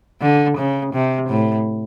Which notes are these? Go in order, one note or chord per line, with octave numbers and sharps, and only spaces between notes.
D3
C#3
C3
A2